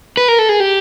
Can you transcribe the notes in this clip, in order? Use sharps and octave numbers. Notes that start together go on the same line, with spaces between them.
B4
A#4
A4
G#4
G4